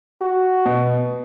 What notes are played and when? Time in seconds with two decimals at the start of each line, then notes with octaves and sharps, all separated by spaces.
0.21 F#4
0.66 B2